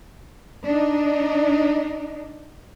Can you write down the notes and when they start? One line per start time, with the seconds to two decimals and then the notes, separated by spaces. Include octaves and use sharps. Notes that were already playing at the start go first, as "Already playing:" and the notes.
0.67 D4 D#4